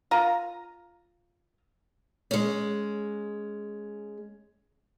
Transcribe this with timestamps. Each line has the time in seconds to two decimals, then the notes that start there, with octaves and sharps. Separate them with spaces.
0.11 F4 A#5
2.31 G#3 C#4